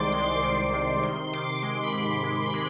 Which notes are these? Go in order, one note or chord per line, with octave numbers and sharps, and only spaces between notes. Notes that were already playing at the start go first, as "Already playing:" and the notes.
Already playing: C2 D#3 G#3 C5 D5 C6 D6
G#3 D6
D#3
C3
D#3 C6
D#3 D6
G#3 C6
B5
G#2 C6
G#3 C6
B5
G#3 C6